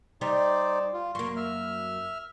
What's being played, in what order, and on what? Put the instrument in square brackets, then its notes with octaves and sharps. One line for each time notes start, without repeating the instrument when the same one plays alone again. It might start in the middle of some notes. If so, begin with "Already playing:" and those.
[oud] G3 [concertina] D#4 C5 D5
[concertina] F4
[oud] F#2 A#3 [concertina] C6 C#6
[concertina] E5 F6